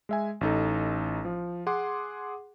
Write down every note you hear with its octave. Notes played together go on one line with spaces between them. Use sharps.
G#3 E5 G#5
A1 D#4 A4
F3
G#4 F#5 C6 D6